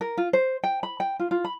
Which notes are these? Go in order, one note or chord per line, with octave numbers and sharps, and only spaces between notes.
A#4
F4
C5
G5
B5
G5
F4
F4
B5